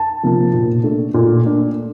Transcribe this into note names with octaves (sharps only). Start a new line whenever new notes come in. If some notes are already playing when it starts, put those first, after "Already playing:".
Already playing: A5
C3 F3 A#3
A#2
A3 D4
A#2
A3 D4